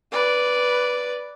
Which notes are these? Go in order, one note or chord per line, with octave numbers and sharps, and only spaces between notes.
B4 D5